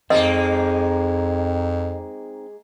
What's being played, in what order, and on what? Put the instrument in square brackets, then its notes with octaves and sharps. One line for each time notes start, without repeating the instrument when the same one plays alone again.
[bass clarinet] F2 [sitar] G#3 A#3 [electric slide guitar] C4 D#4 [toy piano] D#5